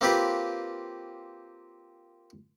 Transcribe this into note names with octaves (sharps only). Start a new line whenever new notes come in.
A#3 C4 F4 G4 B4